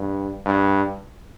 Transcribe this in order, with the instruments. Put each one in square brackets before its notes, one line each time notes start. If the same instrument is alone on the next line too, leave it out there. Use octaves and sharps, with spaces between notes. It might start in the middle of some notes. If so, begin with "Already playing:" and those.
Already playing: [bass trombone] G2
G2